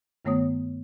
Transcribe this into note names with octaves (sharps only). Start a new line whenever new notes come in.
G2 D#3 A3 B3 C#5 D#6